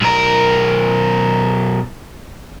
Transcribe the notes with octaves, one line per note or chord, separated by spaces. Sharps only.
B1 A#4